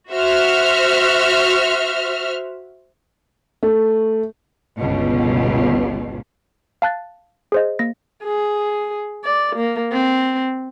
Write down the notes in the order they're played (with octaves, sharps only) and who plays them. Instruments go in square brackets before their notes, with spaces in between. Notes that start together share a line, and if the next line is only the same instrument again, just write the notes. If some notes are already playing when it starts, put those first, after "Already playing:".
[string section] F#4 C5 E5 F6
[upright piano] A3
[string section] G1 C#2 B2
[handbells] F5 A5 F#6 A6
G#4 C5 D#5
A#3 A#6
[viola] G#4
D5
A#3
C4